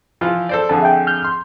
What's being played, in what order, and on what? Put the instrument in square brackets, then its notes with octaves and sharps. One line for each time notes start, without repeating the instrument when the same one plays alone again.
[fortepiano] E3 F3 F4
A4 C5 D5
[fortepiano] F2 D3 G#4 [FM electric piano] A5
[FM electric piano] E5 G5
F6 G6
[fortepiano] C6